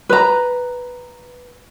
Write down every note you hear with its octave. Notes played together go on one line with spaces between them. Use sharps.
B4 A#5